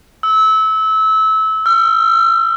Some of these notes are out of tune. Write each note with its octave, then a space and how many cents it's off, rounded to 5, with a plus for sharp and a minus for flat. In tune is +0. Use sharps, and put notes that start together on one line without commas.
E6 -25
E6 +45